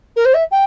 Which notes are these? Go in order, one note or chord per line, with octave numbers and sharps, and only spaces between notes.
A#4
C5
E5
G5